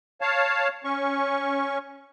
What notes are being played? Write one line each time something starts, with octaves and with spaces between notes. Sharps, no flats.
C#5 F5 A5
C#4 C#6